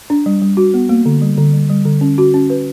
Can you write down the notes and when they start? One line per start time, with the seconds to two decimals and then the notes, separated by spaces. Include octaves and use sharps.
0.10 D4
0.26 G3
0.42 G3
0.57 F#4
0.74 B3
0.89 A#3
1.05 D3
1.22 G3
1.38 D3
1.53 G3
1.69 G3
1.86 D3
2.01 C#4
2.18 F#4
2.34 C#4
2.50 B4